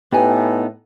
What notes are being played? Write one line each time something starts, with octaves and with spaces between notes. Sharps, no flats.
A2 B3 D#4 G4 B4 G#5